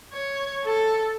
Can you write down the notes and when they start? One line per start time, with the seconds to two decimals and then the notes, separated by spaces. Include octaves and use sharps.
0.13 C#5
0.64 A4